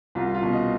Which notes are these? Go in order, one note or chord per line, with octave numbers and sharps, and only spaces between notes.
C2 F4
F4
B2
D#5